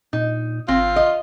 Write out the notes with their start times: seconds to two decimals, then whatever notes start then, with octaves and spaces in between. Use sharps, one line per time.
0.13 A#2 D#4
0.68 G#1 C4 F4
0.96 D#5